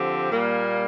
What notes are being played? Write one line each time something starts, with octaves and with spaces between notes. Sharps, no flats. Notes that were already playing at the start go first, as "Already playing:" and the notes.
Already playing: D3 F3 C4 G4
A#2 G3 A#3